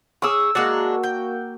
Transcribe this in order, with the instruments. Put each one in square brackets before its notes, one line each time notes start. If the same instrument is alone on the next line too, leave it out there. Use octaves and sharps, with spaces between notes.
[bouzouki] C#4 G#4 [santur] D6 E6
[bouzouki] G#3 D4 [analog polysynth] A#3 F#4
[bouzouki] G5